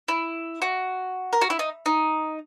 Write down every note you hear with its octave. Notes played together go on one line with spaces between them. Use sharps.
E4
F#4
A#4
F#4
E4
D#4
D#4